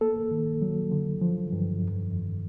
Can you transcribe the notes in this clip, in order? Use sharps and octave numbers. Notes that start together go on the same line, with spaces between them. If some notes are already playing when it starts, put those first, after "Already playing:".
A#3 A4
D#3
F#3
D3
F3
G2
F2
F2